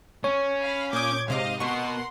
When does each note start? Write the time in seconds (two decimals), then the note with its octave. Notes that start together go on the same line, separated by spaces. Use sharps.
0.24 C#4 C#5
0.62 F5 B5
0.93 A#2 D6 D#6 G6 G#6
1.28 G#2 C3 C5 D#5 F5 D6
1.60 B2 A#4 F#5 C6 C#6